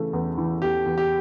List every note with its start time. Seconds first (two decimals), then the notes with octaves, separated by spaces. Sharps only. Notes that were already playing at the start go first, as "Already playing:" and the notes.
Already playing: C#3 E3 A3
0.13 E2
0.38 E3
0.62 E2 G4
0.86 E2
0.98 G4